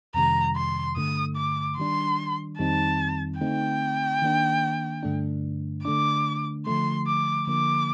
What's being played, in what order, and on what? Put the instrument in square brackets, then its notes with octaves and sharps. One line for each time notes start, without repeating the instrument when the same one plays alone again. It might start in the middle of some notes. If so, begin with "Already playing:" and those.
[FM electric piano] F2 C3 D#3 G3 [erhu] A#5
[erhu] C6
[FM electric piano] G2 D3 A3 [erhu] D#6
[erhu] D6
[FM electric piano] D#3 G3 D4 [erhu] C6
[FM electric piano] F2 D#3 G3 C4 D#4 [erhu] A5
[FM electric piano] D3 A3 C4 D#4 [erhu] G5
[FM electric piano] D#3 A#3 D4
G2 D3 A3 D4
[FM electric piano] D3 A3 D4 [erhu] D6
[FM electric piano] D3 F3 A3 [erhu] C6
[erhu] D6
[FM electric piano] D3 F3 A#3 [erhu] D6